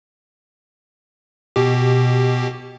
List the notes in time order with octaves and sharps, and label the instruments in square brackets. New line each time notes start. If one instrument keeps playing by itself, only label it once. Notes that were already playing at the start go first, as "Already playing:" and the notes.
[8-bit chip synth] B2 G4